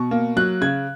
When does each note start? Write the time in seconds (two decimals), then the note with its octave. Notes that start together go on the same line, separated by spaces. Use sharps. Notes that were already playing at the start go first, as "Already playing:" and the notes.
Already playing: B2 C#6
0.11 A#3
0.36 F#3 F#6
0.61 C#3 G#6